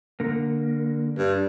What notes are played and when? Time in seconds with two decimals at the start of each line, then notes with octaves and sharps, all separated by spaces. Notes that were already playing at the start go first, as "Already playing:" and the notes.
0.20 D3 A#3
1.18 G2